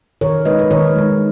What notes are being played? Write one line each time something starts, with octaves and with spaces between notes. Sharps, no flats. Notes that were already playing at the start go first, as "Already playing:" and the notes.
D#3 A#4 C#5
G#3 D#4 B4 D#5
B4
D#3 A#4 C#5
G#3 D#4